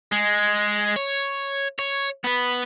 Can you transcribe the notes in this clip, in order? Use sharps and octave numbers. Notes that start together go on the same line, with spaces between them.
G#3
C#5
C#5
B3 B4